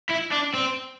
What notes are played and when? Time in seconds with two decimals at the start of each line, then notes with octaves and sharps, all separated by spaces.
0.11 E4
0.33 D4
0.55 C4